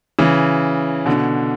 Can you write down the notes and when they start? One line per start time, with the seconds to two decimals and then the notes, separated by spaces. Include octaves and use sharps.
0.19 C#3 E3
1.06 B2 D3